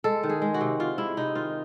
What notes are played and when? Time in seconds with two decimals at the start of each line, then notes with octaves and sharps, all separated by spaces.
0.04 G#3 A4
0.23 D#3
0.29 G#4
0.42 G#3
0.54 F#4
0.61 C3
0.79 C3 F4
0.98 G#3 E4
1.17 C3 D#4
1.35 D#3 F4